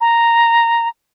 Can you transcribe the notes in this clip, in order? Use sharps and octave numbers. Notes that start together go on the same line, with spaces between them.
A#5